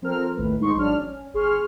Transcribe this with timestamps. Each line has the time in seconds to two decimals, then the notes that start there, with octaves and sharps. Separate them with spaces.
0.02 F3 C4 A4 A#4 F6
0.36 A1 D#2 A2 B4
0.60 G#2 G#3 D#4 C6 C#6
0.75 A1 G#2 F#3 D4 F6
0.99 C#4
1.33 G1 G#4 C6 C#6 F6